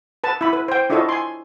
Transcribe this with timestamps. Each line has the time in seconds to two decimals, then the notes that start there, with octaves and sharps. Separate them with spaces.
0.24 B4 A5
0.41 E4 B5
0.53 B4
0.68 C5 G5
0.90 D4 E4 F4 A4 C#5 D#5
1.09 G#5 C6